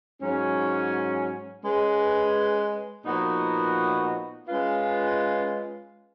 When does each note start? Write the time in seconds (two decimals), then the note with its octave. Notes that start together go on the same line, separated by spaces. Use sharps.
0.22 G#2 F#3 C#4
1.63 G#3 C#4 G#4 B4
3.06 A#2 F3 B3 D#4 F#4
4.49 G#3 C#4 F4 B4